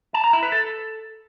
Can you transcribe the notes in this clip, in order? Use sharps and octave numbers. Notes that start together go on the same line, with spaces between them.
A5
A#5
E4
B4
A4